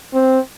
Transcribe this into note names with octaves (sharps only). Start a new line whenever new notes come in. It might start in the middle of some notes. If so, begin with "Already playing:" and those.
C4